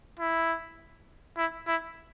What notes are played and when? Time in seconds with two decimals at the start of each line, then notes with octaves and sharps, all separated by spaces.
0.19 E4
1.37 E4
1.67 E4